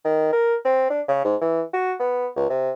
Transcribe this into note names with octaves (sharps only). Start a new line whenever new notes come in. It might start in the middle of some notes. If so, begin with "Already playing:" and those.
D#3
A#4
C4
D4
C#3
G#2
E3
F#4
B3
C#2
C3